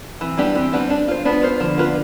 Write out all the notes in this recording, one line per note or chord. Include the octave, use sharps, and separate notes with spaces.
E3 C4
G3 B3 D4 G4
E3 C4
G3 B3 D4 G4
D4
F4 C5
B3 D4
F4 C5
D3 F3
B3 F4 B4